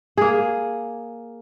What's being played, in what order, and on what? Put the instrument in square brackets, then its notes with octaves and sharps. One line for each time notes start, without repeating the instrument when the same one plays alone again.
[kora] A#3 G#4